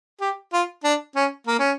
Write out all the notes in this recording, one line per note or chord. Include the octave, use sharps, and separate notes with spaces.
G4
F4
D4
C#4
A#3
C#4